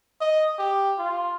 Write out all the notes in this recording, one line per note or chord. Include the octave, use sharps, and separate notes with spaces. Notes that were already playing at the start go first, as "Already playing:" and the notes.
D#5
G4
F4